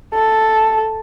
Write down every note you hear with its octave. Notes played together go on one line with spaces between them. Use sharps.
A4